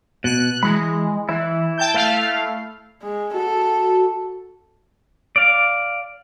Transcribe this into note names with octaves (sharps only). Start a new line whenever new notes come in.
B2 F#6
E3 G#3 B5
E3 E4
G5 A5 G6
A3 F5
G#3
F#4 A4
D5 F5